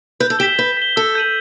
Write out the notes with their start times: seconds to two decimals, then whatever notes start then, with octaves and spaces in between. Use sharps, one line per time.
0.20 B4 G6
0.30 A4
0.39 G4 B6 E7 G7
0.58 B4 G6
0.77 B6 E7 G7
0.96 A4 E6
1.15 G6 D#7 F#7